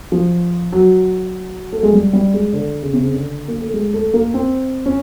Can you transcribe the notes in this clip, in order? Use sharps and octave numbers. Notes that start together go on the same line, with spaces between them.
F3
F#3
A3
G#3
G3
G3
G#3
D3
C#3
C3
C#3
D3
A#3
A3
G#3
A3
A#3
C4
C#4